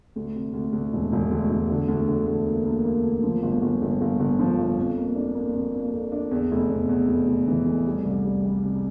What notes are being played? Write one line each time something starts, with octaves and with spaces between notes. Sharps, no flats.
D2
C3
D2
D2
E1
E1
D2
E1
D3
D2
D3
D2
A#3
A#3
A#3
D2
F3
G1
G1
G1
G1
G1
F3
G1
F2
A#3
D4
A#3
F2
A#3
F2
D4
E2
F1
E2
E2
F1
F1
E3
F1
G3
C2
G3
G3
C3